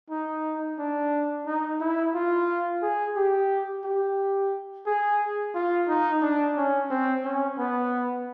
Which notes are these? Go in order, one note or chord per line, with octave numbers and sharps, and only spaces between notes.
D#4
D4
D#4
E4
F4
G#4
G4
G4
G#4
F4
D#4
D4
C#4
C4
C#4
B3